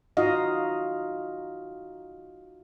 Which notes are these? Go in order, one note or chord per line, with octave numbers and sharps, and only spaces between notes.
D#4 F4 F#4 D#5 F5